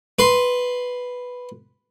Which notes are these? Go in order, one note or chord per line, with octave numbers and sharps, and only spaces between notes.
B4 C6